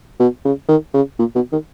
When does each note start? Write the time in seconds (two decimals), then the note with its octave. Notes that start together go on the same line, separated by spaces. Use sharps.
0.20 B2
0.45 C#3
0.69 D#3
0.94 C#3
1.19 A#2
1.35 B2
1.52 D#3